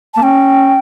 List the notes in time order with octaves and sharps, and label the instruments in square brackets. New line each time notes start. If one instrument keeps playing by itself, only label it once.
[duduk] A#3 [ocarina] A5
[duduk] C#4 [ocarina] G5